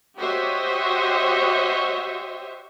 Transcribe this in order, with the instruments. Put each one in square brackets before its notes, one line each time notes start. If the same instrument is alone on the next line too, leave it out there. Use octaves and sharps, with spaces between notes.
[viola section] F#4 G4 C5 C#5 D#5 E5